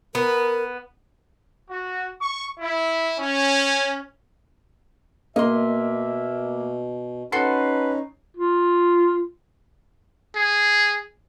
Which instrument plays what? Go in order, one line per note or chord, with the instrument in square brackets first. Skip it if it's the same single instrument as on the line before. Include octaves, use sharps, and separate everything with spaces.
[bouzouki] B3 [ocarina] A#4
[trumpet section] F#4
C#6
E4
C#4
[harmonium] B2 [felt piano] A#3 [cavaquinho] D#5 C6 [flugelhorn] E5
[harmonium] C#4 D#4 [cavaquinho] F#4 A4 C6 [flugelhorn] B4 [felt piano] C7
[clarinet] F4
[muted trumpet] G#4